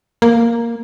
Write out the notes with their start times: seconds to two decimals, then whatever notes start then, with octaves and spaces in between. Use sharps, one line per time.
0.22 A#3